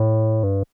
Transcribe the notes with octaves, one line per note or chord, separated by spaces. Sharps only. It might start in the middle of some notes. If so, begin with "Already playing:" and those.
Already playing: A2
G2